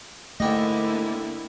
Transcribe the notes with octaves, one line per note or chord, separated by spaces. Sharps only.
G#2 D3 A3 A#3 E4 G4 D#5